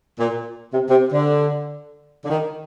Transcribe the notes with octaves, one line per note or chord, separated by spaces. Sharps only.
A#2
C3
C3
D3
D3
D#3